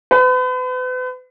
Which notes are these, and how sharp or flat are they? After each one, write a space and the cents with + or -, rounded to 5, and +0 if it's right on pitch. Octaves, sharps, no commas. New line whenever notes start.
B4 +40